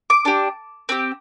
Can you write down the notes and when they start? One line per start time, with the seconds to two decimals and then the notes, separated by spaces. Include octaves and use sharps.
0.10 D6
0.25 D4 G4
0.89 C4 G4